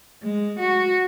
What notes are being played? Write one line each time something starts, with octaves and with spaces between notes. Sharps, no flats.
G#3
F#4